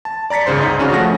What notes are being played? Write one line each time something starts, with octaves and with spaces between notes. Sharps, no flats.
A5
D5 A#5 A6 B6 C#7
G1 C#2 G#2 C#3 C5 C6
D#4 D#5
C#3 C#4 D4 F#4
F3 A3 F#5 A#6